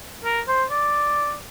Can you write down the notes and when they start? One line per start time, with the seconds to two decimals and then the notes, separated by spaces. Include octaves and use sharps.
0.25 A#4
0.48 C5
0.70 D5